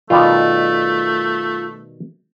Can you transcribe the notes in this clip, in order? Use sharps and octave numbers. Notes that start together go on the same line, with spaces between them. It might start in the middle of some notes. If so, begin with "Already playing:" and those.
B2 D#3 G3 A3 F4